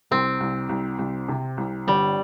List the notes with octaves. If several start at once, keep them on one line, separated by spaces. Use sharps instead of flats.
C2 C4
C2
C2
C2
C3
C2
G1 G3